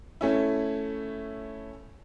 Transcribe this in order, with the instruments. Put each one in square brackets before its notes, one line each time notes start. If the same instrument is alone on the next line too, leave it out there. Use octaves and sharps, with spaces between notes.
[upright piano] A3 C#4 E4